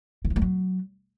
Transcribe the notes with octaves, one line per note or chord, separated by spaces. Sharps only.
D#3
F3
G#3
F#3